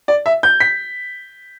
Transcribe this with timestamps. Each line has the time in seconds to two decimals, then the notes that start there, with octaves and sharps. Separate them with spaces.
0.08 D5
0.26 E5
0.43 G6
0.60 B6